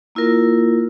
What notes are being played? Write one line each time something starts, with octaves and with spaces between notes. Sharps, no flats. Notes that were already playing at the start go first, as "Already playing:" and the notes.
A#3 E4 F4 A#4